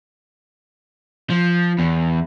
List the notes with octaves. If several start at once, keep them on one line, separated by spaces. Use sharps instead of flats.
F3
E2